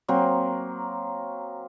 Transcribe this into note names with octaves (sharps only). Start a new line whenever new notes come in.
F#3 A#3 C4